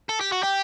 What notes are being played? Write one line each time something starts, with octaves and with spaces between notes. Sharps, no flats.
A4
G4
F#4
G4